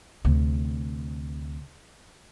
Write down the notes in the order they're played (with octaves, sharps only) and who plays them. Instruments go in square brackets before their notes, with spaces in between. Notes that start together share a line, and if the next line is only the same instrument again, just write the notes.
[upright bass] D2 C3